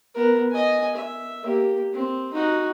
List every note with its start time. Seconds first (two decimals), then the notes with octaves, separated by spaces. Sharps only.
0.15 B3 A#4
0.51 D#5 G#5
0.95 E5
1.43 A#3 G4
1.93 C4
2.33 D#4 F#4